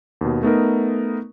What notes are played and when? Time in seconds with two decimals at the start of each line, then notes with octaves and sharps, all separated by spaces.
0.21 D#2 B2
0.43 A3 B3 D#4 A#4